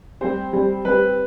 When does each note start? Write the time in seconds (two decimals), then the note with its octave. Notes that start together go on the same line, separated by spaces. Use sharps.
0.21 G3 C4 G4 C5
0.53 G3 C4 G4
0.85 G3 C4 G4 B4